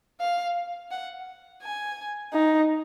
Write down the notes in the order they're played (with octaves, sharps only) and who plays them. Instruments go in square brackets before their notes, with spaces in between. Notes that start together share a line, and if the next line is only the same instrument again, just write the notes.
[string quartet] F5
F#5
G#5
[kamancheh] D#4